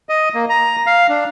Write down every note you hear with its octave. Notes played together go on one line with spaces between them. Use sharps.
D#5
A#3
A#5
F5
D4